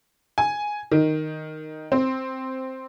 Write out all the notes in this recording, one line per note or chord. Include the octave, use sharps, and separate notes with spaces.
G#5
D#3
C4